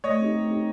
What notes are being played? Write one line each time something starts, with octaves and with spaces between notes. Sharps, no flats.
A3 C#5 D#5
C4 D#4 G4
A3
C4 D#4 G4